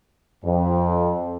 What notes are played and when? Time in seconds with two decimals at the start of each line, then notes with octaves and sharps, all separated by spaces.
0.44 F2